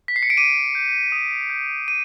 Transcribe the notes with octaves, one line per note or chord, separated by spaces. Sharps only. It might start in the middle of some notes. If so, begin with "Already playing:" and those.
B6
C7
C#7
D7
D6 D#7
G6
D#6
G6
D#6 D#7